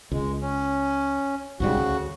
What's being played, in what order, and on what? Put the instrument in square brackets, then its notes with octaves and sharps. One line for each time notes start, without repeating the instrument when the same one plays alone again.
[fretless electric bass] C#2 [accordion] G#3
[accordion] C#4
[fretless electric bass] C2 G#2 G3 [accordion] C#3 F#4
[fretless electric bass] D2